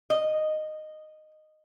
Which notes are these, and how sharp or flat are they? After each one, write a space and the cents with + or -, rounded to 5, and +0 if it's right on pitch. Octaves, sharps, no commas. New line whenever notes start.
D#5 -10